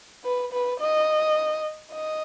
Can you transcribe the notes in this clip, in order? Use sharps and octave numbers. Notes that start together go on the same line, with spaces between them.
B4
B4
D#5
D#5